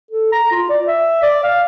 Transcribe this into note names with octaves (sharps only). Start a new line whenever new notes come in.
A4
A#5
F4
D5
E5
D5
F5